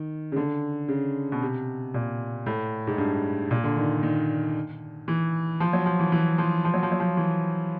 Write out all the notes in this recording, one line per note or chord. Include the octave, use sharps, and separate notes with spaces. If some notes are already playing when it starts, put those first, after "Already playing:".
Already playing: D#3
C#3
D3
C#3
B2
C3
A#2
A2
G#2
G2
A#2
D3
D#3
D#3
E3
F3
F#3
F3
E3
E3
F3
F3
F#3
F3
F#3
F3
E3